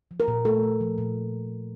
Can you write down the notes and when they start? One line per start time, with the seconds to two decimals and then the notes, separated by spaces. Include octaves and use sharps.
0.11 F3
0.20 A#4
0.28 A#2
0.45 A3 A4
0.63 A#2
0.81 F3
0.98 A#2